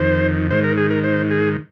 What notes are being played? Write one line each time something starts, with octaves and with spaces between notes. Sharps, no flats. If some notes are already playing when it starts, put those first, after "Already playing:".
Already playing: F2 D#3 C5
G#2 D#3 C5
A#4
G#4
A#4
C5
G#4